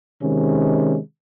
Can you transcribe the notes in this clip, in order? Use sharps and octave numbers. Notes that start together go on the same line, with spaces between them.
C3 D#3 G#3 C#4